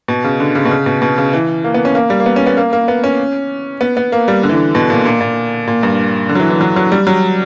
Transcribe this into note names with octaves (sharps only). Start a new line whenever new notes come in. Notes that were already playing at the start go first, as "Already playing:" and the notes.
B2
C#3
D3
C#3
B2
C#3
B2
B2
C#3
E3
A#3
B3
C#4
A#3
G3
A#3
B3
C#4
B3
A#3
A#3
B3
C#4
B3
B3
A#3
G3
D3
E3
D3
B2
A#2
A#2
A#2
A#2
G2
D3
F#3
E3
E3
F#3
F#3
G3
F#3